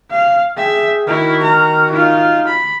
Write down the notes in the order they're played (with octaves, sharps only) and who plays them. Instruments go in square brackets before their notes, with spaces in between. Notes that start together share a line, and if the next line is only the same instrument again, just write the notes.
[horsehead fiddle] F5
[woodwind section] G#4 G5 [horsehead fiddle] E5
[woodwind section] D#3 F#4 F6 [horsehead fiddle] E4
[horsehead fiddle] A#5
D#4 F4
B5